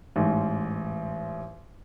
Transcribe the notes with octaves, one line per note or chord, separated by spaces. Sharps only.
A1 G#2